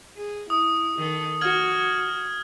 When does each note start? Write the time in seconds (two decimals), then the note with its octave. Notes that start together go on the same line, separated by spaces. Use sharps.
0.16 G#4
0.50 E4 D#6
0.98 D#3 A4
1.41 F#4 F6 G#6 F#7